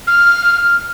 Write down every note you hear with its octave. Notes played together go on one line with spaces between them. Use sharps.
F6